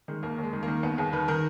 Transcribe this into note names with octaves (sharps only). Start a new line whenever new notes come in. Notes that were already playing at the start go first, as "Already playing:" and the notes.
D#3 G#3
D#2 A#3
D#2
G#3
D#3
A#3
D#3
D#2 B3
D#2 G#4
D#3 B4
D#3 A#4